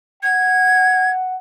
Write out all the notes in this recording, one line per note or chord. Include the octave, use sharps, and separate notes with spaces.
F#5 G#6